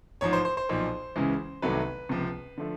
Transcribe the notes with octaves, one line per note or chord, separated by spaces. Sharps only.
A1 G#2 F3 C#5
C5
C5
C5
B1 A#2 F3
C#2 C#3 E3 G#3
C2 C3 D#3 F#3 A3 B4
C#2 C3 F3
D3 F3 A3